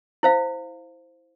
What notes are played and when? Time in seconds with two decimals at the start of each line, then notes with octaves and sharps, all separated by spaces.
0.23 E4 C5 F5